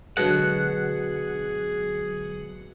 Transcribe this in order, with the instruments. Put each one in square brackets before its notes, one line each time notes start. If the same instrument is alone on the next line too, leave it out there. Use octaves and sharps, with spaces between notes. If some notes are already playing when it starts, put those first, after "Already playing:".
[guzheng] B2 [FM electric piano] D3 F#3 G#3 [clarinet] G#4 [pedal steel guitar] F#5